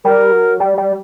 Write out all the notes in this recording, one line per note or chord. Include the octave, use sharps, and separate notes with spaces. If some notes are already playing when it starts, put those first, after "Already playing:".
G3 A#4
F#3
G3
G3